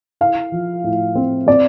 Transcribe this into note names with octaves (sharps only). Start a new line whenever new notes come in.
E4 F5
F3
A2
C4
C4 D5